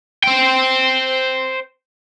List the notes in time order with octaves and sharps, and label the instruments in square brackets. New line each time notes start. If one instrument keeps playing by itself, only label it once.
[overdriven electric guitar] C5 G5